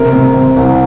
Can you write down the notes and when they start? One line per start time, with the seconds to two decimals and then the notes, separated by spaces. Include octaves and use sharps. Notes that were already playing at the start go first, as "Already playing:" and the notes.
Already playing: C3 A#4
0.13 C3
0.34 C3
0.56 C2